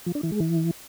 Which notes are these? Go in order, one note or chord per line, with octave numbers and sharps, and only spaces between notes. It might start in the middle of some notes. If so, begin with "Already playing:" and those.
F3
D4
E3
G#3
E3